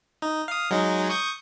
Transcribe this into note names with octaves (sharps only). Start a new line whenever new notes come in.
D#4
F5 D#6
F#3 G#3 D#4
C#6 D#6 G6